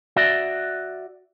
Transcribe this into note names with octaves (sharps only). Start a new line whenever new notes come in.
F#4 D5 E5